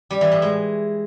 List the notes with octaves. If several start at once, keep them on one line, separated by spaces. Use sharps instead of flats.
G3
E3
A2
G#3